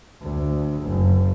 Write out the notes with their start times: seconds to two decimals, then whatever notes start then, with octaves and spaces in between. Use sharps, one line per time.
0.22 D2
0.82 F#1